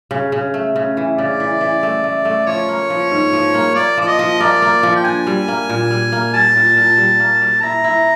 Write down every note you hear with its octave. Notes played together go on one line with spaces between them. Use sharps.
C#3
C#3
A3
C#3
E3
C#3 D5
E3
E3
A3
A3
A3
F3 C#5
A#3
F3
G#2
F3
A#3
A#3 D5
F3 D5
D#5
F3
A#3 D5
A#3
F3
G5
D4 G#5
G3
A#3
A#2
G3
A#3
G3 A5
A#2
A#2
G3
A#3
G3
E4 A#5
E4